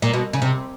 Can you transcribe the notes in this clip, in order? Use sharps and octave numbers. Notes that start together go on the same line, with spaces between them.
A#2
B2
C#3
C3